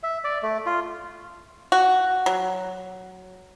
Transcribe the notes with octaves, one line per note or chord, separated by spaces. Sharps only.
E5
D5
A3
F4
F#4
F#3